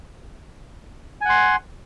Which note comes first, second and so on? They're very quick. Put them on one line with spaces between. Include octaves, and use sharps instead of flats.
G#5 F#5 C6